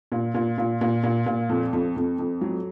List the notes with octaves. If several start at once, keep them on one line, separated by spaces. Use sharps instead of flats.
A#2
A#2
A#2
A#2
A#2
A#2
F2
F2
F2
F2
F#3